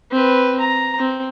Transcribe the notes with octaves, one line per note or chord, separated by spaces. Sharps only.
C4 B4
A#5
C4